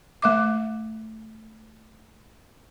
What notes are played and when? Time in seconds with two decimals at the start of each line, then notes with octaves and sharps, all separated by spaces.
0.22 A3 E5 D6